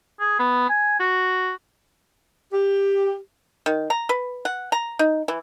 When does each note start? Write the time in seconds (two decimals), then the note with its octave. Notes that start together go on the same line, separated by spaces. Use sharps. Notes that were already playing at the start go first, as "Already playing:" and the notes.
0.20 G#4
0.39 B3
0.69 G#5
1.00 F#4
2.53 G4
3.66 D#3
3.90 A#5
4.09 B4
4.45 F#5
4.72 A#5
4.99 D#4
5.28 E3